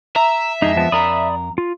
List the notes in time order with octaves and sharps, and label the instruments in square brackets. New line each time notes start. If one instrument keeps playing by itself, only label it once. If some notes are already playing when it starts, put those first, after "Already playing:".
[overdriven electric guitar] E5 [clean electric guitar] A#5
[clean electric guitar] F2 G#3 [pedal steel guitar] D#4
[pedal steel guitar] F3 B3 A5
[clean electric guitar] F2 A#4 [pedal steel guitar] D5 B5 D#6
[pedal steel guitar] F4